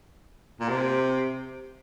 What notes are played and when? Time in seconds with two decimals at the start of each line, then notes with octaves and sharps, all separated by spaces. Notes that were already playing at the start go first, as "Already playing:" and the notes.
0.60 A#2
0.69 C3